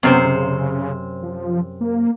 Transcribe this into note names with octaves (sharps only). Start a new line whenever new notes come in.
F#2 C3 B3 C5
C#3
F3
A#3